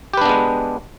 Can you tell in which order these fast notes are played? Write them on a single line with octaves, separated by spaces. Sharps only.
G4 B4 D4 B3 G#3